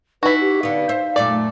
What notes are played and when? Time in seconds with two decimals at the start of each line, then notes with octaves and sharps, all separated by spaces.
0.23 D#4 E4 F#4 B4 B6
0.40 G4
0.63 D3 B3 F5
0.89 C5 E5
1.16 F#2 A#2 A3 D5